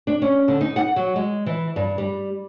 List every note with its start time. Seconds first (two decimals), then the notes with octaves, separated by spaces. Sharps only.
0.07 D4
0.22 C#4
0.48 D3
0.61 D#4
0.76 F#5
0.96 F#3
1.16 G#3
1.46 E3
1.76 G2
1.98 G3